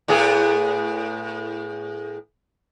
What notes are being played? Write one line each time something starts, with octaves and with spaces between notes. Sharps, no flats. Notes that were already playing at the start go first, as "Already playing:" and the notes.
A2 B3 G#4